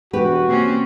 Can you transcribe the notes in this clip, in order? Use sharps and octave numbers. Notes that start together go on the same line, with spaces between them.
E1 F#4 G4 B4
C3 A#3 C#4